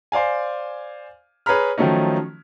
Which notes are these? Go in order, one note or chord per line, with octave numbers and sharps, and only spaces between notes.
C5 D5 F5 G#5
G#4 B4 C#5 A#5 B5 F6
D#3 F3 F#3 A3 C#4 D#4